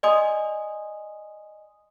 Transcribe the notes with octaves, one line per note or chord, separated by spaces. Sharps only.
D5 D#5 G#5 C6 D#6